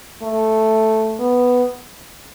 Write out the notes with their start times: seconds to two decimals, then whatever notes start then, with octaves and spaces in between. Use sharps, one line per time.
0.22 A3
1.20 B3